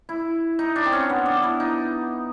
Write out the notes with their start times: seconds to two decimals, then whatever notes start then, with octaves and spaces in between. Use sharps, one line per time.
0.09 E4
0.59 D#4
0.76 D4
0.85 C4
0.92 C#4
1.09 B3
1.26 D4
1.43 E4
1.60 D#4